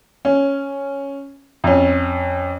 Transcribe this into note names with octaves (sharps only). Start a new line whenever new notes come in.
C#4
F2 C#4